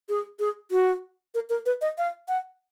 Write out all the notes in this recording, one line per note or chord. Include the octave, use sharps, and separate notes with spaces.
G#4
G#4
F#4
A#4
A#4
B4
D#5
F5
F#5